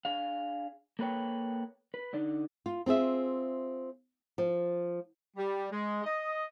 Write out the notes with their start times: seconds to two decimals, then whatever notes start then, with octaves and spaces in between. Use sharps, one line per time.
0.05 D4 G#4 F5
0.99 A#3 A4 B4 C#5 G5
1.94 B4
2.13 D3 D#4 D5
2.66 F4
2.86 C4 F4 G#4 E5
4.38 F3
5.37 G3
5.71 G#3
6.04 D#5